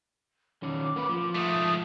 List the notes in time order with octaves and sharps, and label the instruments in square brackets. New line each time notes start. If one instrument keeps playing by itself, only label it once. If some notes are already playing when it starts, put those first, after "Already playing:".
[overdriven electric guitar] D#3 C#4 [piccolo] D6
[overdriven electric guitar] A#3 B4
F3
[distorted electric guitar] G#2 A3 [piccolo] D#6